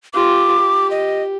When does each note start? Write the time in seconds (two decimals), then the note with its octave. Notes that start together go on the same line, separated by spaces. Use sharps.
0.14 F4 G4 D6
0.58 G4
0.91 D#5